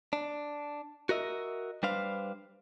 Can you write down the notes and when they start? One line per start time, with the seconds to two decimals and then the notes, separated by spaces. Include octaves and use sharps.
0.13 D4
1.09 F#4 A#4 D#5 E5
1.83 G3 D4 B4 C5 F5